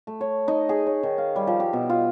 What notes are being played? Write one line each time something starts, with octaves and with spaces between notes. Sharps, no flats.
A3
C#5
D#4
G#4
C#5
D#3
F5
G3
F3
G4
B2
F4